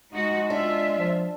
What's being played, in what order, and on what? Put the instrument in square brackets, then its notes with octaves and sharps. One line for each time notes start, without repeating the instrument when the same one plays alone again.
[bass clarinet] G#3 [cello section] D#4 F#4
[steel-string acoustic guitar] D4 [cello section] F4 E5
[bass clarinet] F3